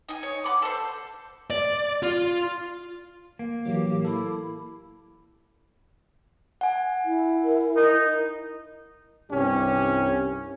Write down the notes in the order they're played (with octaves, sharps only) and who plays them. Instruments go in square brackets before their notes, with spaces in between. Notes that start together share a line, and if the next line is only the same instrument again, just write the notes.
[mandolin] D#4 G#5
C#5
F#5 B5 D6
A4 C5
[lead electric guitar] D5
F4
[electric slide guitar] A#3
[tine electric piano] A2 E3 F#3 [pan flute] G4
[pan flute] E4 [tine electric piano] A4 D6
[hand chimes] F#5 G#5
[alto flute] E4
[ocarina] A#4
[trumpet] D#4
[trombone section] C2 G2 C#4 G4